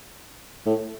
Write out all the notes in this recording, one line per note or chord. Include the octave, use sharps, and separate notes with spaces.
A2